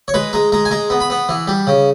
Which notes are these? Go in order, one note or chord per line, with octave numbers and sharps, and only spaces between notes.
C#5
G#3 B4
G#3 A#5
G#3 A#5
G#5
G#3 A#5
B3
B5
B3
E3
G3
C#3